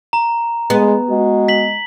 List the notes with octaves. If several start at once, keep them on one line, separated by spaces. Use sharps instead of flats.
A#5
G#3 B3
G#3 F#4
B6 F#7